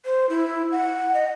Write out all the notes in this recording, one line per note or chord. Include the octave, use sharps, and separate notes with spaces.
C5
E4
F#5
D#5